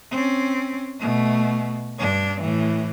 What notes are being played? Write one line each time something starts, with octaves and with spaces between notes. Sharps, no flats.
C4 C#4
B2 A3
G2 D4
A2 E3